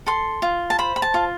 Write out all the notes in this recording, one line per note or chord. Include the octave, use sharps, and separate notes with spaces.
A4 C6
F4
A5
C5 B5
B5
A5
F4